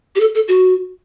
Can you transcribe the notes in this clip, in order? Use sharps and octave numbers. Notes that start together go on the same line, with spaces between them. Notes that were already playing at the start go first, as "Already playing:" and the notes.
G4
A4
A4
F#4